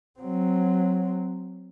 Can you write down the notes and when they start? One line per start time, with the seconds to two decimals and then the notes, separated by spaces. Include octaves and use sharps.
0.20 F#3 C4